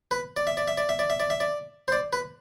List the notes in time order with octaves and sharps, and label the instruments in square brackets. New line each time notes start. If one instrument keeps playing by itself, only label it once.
[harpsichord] B4
D5
E5
D5
E5
D5
E5
D5
E5
D5
E5
D5
C5
D5
B4